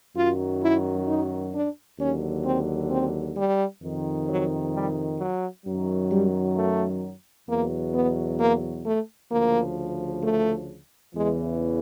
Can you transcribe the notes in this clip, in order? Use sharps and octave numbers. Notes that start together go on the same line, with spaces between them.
F#2 D#3 F#3 F4
E4
D#4
D4
D#2 D3 F#3 C#4
C4
C4
G3
F2 C3 D#3
F#3
G3
F#3
F#2 D#3 F#3
G3
A3
E2 B2 F#3 A#3
B3
A#3
A3
D2 C#3 F3 A#3
A3
E2 C#3 E3 G#3